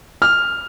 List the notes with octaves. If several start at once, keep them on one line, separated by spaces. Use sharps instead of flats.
F6